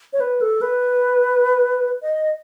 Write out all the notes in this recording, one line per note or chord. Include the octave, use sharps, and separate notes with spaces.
C#5
B4
A4
B4
D#5